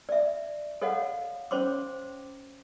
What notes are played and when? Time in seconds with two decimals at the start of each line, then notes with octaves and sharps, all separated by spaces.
0.09 D5 E5
0.82 A4 C#5 D#5 F5 F#5
1.51 C#4 C5 C#5 C6 D6